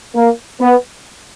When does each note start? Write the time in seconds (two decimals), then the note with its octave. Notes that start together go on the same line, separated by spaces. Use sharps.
0.14 A#3
0.60 B3